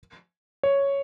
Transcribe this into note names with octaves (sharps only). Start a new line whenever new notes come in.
C#5